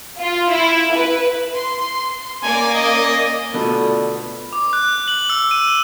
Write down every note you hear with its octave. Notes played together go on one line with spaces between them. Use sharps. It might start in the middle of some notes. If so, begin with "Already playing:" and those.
F4
E4
B4
C6
A#3 C#4 D5 G#5
D#5
B2 D3 A3 B3 F4 A4 D5
D6
F#6
F#7
E6
D#7